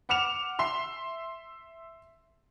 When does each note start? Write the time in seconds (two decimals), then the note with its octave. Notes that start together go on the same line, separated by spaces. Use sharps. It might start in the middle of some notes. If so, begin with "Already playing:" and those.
0.09 F#5 D6 F6 C#7 E7 F7
0.59 E5 C6 C7